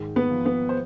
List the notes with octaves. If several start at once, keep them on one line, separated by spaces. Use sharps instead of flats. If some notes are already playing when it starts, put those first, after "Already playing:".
Already playing: G#2 D#3
B3 B4
F3
B3 B4
C5